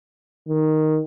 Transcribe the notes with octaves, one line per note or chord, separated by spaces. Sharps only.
D#3